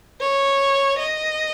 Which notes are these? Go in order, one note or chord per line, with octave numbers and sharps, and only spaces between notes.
C#5
D#5